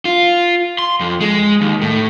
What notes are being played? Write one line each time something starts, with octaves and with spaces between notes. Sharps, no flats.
F4
C6
F2
G#3
D#2
A2